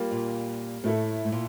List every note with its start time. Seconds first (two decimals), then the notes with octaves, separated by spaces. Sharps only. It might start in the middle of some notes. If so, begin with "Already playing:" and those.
Already playing: G3 A#3 F4 A#4
0.11 A#2
0.84 A2 A3 E4 A4
1.25 A2
1.32 A#2